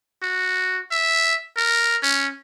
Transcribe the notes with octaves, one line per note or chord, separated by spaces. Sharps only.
F#4
E5
A#4
C#4